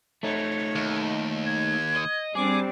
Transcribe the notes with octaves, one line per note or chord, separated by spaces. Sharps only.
A3 D#4 C#5
D#2
G#6
D#5
G3 C4 D4 G#4 D6